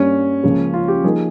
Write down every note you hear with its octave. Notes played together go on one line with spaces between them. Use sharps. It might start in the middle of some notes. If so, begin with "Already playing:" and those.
Already playing: G2 G3 A#3 C#4
C#2 C#3 F3 A#3
F4
G4
F3 A#3 D#4 G#4 A#4